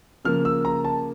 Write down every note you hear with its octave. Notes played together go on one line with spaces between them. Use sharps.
C#3 F3 A#3 F6
E6
A#5
A5